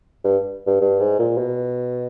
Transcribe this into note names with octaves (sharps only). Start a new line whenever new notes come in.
G2
G2
G2
G#2
A#2
B2